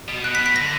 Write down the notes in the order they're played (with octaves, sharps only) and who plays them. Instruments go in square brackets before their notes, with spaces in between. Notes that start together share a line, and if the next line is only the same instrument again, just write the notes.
[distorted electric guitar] B2
[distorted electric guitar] B2 [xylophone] F#6
[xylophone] B6
B6
[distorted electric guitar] D3 [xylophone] A#6